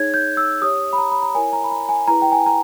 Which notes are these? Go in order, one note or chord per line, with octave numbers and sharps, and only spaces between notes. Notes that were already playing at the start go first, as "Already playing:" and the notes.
Already playing: D#4 G#4 C#5 G#6
G6
E6
G4 C#5 D#6
B5
A#5
B5
A#5
E4 A#4 C#5 G#5
A#5
B5
A#5
G#5
E4 G#4 B4 A#5
G5
G#5
A#5